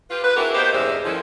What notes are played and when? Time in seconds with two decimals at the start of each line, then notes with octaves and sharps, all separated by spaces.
0.10 F4 G4 B4
0.24 B4
0.36 C4 D4 E4 F#4 G#4 A#4
0.54 A#3 B3 D#4 G4 C5
0.73 E2 G2 C#3 G#3 C5 E5
1.05 D#3 F3 G#3 A3 C#4 E4